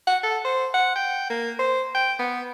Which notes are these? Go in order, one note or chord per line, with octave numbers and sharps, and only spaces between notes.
F#5
A4
C5
F#5
G5
A#3
C5
G5
B3